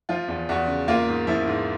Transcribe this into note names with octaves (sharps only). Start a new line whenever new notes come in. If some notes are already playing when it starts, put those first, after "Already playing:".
F3 F4
E2
E2 F#4
C#3
A#3 F4
G#2
F3 E4
G#2